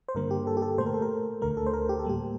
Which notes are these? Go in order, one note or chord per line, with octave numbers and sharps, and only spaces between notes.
C5
G2 D3 G3 A#3 A#4
G4
A4
G4
A4
A#2 A3 C5
A#4
A4
A#4
D2 D3 A3 A#4
A4
C5
A#4
G4
A4
A2 G3 A#3 G4